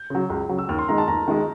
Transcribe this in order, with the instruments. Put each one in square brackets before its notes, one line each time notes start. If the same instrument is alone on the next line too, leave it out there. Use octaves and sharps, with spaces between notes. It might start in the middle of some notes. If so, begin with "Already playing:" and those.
Already playing: [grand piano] G6
[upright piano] C#3 F#3
C#2
C#3 F#3
[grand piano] E6
[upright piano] D#2 [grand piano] F6
[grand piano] C6
[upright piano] D#3 G#3 [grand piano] A#5
[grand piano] A5
[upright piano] D#2 [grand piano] A#5
[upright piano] D#3 G#3